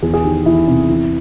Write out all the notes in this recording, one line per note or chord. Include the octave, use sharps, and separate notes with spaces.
E2 G#4
G#4
D#3 G4
E2 E4
C3
E3